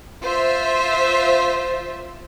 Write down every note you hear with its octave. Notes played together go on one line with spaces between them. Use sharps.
F4 C5 E5